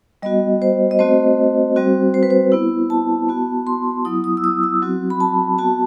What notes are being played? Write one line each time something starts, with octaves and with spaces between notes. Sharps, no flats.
G3 B3 F#4 D#5
C5
D#5
A3 C4 F#4 C5
G3 C4 F#4
C5
B4
C5
B3 E4
A5
B3 F#4
C6
F#3 B3 E4 D#6
D#6
E6
D#6
E6
F#3 C4 F#4
B5
A5
B3 F#4 A5